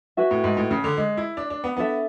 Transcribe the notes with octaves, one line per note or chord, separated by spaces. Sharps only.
F#4 B4 E5 G#5
A2
G#2
A2
C#3
D3
G#3
E4
D4
D4
B3
B3 D4 A4 E5